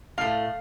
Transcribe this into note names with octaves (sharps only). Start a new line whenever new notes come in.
A2 A3 F5